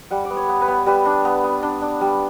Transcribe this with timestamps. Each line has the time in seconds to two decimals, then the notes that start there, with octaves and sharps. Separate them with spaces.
0.11 G3 F#5
0.25 D5
0.30 B3
0.37 C#5
0.49 B3
0.61 B4
0.68 B3
0.86 G3 B4
1.06 D4
1.25 B3
1.44 B3
1.63 D4
1.82 D4
2.01 G3